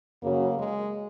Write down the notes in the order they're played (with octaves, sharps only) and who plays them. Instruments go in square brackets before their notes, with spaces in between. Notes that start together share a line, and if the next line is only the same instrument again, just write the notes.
[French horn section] F#2 C#3 F#3 [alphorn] A#3
[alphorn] G#3